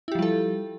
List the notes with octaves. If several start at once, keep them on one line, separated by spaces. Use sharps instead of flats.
F3 G3 E4 G4 A4